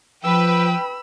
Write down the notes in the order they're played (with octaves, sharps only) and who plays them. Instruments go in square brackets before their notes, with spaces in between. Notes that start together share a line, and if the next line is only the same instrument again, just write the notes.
[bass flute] F3 [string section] B4 G5 [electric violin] B5 E6